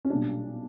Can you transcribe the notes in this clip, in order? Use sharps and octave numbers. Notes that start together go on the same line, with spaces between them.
C#4
B1 A#2 G3 D4